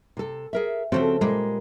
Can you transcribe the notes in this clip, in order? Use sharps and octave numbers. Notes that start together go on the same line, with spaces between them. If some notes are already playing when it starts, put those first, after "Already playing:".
C3 A4
G#4 A#4 E5
C#3 F3 A3 C4 F#4 C5
A#2 G3 G#3 A#3